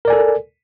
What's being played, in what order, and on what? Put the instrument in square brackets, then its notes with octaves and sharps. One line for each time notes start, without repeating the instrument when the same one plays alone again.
[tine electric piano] A#4
D5
G#5
A4